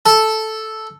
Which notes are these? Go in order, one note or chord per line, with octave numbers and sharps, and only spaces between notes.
A4